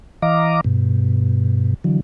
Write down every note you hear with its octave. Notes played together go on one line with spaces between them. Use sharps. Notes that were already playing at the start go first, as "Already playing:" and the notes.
E3 D#5 F5 A#5 D6
G2 B2
D3 E3 F#3